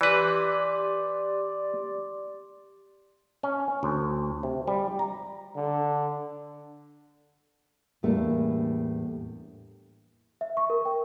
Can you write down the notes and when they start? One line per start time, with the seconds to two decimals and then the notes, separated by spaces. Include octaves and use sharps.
0.01 E3 G4 B4 D5 C6 D6
3.43 C#4
3.83 D2
4.43 C3
4.68 G3
4.99 A#5
5.56 D3
8.03 E2 A2 G3 A3 A#3 D4
10.41 E5
10.57 C#6
10.70 A#4
10.85 G5